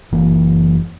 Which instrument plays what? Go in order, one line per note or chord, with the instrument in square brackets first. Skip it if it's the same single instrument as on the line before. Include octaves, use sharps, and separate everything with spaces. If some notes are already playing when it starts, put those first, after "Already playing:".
[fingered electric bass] F#1 E3 A#3